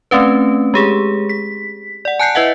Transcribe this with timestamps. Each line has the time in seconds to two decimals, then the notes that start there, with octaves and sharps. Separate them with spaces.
0.11 A3 C4 C#4 B4
0.74 G#3 G4 G#4
1.29 B6
2.05 D5 F#5
2.20 G#5 A5 F#6 G6 C7 C#7
2.35 E4 B4 D#5 E5 F#5